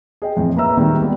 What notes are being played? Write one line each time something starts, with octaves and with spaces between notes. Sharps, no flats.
G#4 D#5 G5
F2 A2 E3
A#3 B4 E5 A#5 E6
A#2 D#3 G3 G#3 A#3
G3 G#3 B3 G4